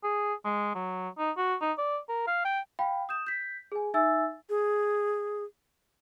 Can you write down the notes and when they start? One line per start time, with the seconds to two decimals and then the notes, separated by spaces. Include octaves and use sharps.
0.04 G#4
0.45 G#3
0.75 F#3
1.18 D#4
1.37 F#4
1.61 D#4
1.78 D5
2.09 A#4
2.27 F5
2.45 G5
2.79 F5 G5 B5
3.09 D#6 G6 E7
3.27 G6 B6
3.72 G#4 G#5
3.94 D#4 E5 G#5 E6 A6
4.50 G#4